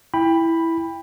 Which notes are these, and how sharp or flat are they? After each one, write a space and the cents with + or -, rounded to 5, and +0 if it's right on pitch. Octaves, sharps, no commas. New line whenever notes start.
E4 +0 G5 +25 B5 +0